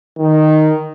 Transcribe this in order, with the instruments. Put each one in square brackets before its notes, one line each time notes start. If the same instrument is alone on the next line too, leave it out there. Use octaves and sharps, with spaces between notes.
[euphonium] D#3